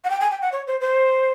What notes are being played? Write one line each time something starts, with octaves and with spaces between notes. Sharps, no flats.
F#5
G5
G#5
G5
F#5
C#5
C5
C5